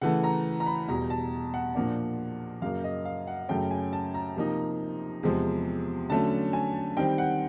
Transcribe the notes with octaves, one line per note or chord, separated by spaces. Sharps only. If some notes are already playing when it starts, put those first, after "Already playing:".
C#3 E3 A3 F#5
A#5
A#5
B5
E2 B2 G3 A#5
A5
F#5
A#2 F3 A#3 D4
F#2 C#3 F#3 A#3 F5
D#5
F5
F#5
F#2 C#3 F#3 A3 C#4 G5
G#5
A5
A#5
C3 F3 A#3 D#4
E2 C3 F3 G#3
D3 F#3 A3 C#4 A5
G#5
D#3 G3 C4 G5
F#5